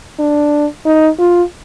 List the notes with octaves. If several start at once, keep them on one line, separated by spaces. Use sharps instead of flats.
D4
D#4
F4